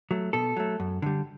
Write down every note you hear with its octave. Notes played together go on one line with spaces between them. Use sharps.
F#3 A3
B2 A4
F#3 A3
F#2
D3 G3